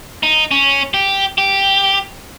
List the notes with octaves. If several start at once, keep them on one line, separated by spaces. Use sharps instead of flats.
D#4
C#4
G4
G4